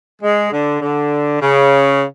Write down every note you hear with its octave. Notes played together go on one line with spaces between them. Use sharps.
G#3
D3
D3
C#3